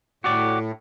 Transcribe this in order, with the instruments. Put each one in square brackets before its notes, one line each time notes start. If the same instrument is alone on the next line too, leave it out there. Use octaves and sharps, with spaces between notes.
[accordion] A2 [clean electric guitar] F#4 G4 D5